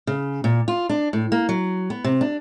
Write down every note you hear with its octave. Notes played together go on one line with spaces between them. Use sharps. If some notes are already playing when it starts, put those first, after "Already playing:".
C#3
A#2
F4
D4
A2
A#3
F#3
B3
C3
D4